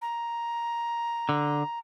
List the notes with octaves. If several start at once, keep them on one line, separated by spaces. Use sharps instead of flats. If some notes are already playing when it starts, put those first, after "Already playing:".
A#5
D3